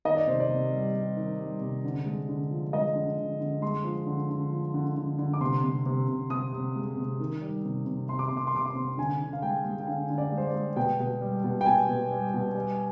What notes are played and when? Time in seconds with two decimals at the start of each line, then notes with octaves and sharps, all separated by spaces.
0.05 D#3 D#5
0.16 D5
0.27 C3 C5
0.40 D5
0.49 C3
0.72 G3
0.95 G3
1.17 D#3
1.39 G3
1.61 C3
1.84 D3
2.06 G#3
2.29 D3
2.51 F3
2.73 G#3 D#5
2.95 D3
3.18 D3
3.40 D3
3.62 G#3 C6
3.84 F3
4.06 D3
4.30 D3
4.51 F3
4.74 D3
4.96 D3
5.18 D3
5.33 D6
5.41 C3 C6
5.64 C3
5.86 C3
6.08 C3
6.30 C3 D#6
6.53 C3
6.76 G#3
6.97 C3
7.20 D#3
7.41 G3
7.65 C3
7.86 C3
8.08 C3 C6
8.19 D6
8.28 C3 C6
8.37 D6
8.47 C6
8.54 C3 D6
8.66 C6
8.75 C3
8.98 D3 G#5
9.21 D3
9.33 F5
9.42 G#3 G5
9.65 G#3
9.80 G5
9.87 D3 F5
10.10 D3
10.18 D5
10.32 G#3
10.37 C5
10.47 D5
10.55 G#3
10.76 B2 G5
11.00 B2
11.21 G3
11.44 B2
11.61 G5
11.66 B2 G#5
11.89 B2
12.11 G3
12.34 B2
12.55 G3